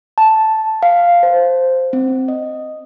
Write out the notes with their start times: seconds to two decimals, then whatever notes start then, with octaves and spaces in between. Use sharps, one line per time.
0.18 A5
0.83 F5
1.23 C5
1.93 C4
2.28 D#5